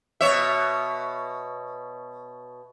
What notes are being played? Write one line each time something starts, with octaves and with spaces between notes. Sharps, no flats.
B2 C#5 E5